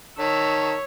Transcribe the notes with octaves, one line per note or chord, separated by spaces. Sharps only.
D#3 C#5 A5 E6 B6